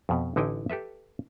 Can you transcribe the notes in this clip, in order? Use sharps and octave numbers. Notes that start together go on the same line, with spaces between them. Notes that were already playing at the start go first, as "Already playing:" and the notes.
F2 B2
A1 D3 D#4 E4 G5 G#5
G4 A4 B4 E5